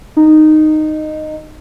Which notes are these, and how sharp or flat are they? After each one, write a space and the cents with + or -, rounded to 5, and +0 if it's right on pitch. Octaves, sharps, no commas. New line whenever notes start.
D#4 -10